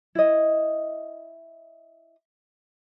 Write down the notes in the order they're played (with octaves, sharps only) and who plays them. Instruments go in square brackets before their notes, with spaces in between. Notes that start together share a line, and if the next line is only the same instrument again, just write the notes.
[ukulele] E4 D#5